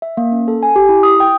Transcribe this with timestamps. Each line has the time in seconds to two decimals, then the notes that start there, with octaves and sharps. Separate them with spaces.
0.02 E5
0.17 A#3
0.32 C#4
0.48 A4
0.63 G#5
0.76 G4
0.89 E4
1.03 D#6
1.20 G5